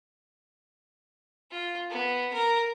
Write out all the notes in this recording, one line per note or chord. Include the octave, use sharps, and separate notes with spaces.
F4
B3
A#4